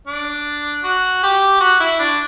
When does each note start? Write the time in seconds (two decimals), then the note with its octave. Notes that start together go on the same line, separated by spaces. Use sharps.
0.07 D4
0.84 F#4
1.23 G4
1.60 F#4
1.80 E4
1.99 D4